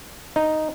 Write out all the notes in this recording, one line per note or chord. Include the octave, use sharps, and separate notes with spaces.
D#4